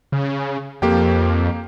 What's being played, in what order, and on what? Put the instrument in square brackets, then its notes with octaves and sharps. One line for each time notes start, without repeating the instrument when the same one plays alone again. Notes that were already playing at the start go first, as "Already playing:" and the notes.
[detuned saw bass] C#3
[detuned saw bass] F2 [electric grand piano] A#3 G4 G5